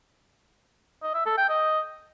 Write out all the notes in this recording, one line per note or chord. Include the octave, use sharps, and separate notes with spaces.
D#5
E5
A4
G5
D#5